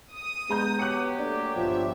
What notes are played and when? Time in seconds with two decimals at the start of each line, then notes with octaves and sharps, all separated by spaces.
0.13 D#6
0.50 G#3 B3 A#5 G6
0.79 F#3 G4 F#6 C#7
1.18 A3 A#3 D4
1.56 G1 F3 B3 E5